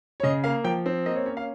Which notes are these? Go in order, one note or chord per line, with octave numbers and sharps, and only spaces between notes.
C#5
C#3 D#5
A#3 F5
F3 G5
C4
A#3 D#5
C#5
C#4 C#5
F5